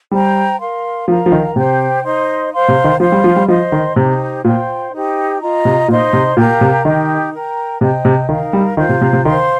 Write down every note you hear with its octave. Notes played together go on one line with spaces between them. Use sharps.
G3 C5 G5 A#5
A#4 F5 C6
F3 A#4 F5 A#5
F3
D#3
C3 G4 C5 G5
D#4 C5 D#5 C6
C5 F5 C6
C3
D#3
F3 C5 F5 C6
G3
F3
G3
F3 C5 D#5 C6
D#3
C3 D#4 G4 C5
A#2 F4 C5 G5 C6
D#4 G4 C5 G5
F4 D#5 A#5
C3
A#2 D#4 C5 D#5 C6
C3
A#2 G4 A#4 F5 A#5
C3
D#3 D#4 G4 D#5
A#4 G5 A#5
C3 C5 D#5 G5
C3
D#3 D#4 A#4 F5
G3
D#3 F4 C5 F5
C3
C3
C3
D#3 C5 F5 C6